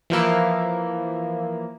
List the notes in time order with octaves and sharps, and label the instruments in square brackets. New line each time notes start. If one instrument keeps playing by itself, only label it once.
[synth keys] E3 F3 A#3 E4